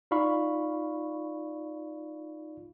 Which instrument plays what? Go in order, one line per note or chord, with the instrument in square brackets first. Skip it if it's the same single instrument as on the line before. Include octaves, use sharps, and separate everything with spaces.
[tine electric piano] D#4 F4 D5 F5 B5 C#6